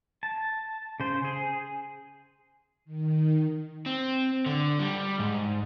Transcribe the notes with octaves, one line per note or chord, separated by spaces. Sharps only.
A5
C#3 C5
G#4
D#3
C4
D3
G3
G#2